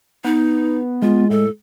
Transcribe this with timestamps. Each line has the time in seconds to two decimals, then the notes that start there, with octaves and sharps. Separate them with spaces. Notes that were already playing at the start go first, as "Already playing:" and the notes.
0.25 B3 D#4
1.02 G#3 F4
1.30 A2 A4